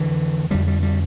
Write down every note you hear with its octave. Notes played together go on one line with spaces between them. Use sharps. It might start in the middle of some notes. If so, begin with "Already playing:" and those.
Already playing: F2 D3 E3
F2 D3 G3
G3
G3